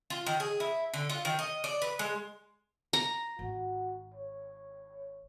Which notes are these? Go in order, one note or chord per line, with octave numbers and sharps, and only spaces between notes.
F4
D#3
G#4
E4
D3
F4
D#3
D#5
D5
B4
G#3
A#5
G#1 F#4
C#5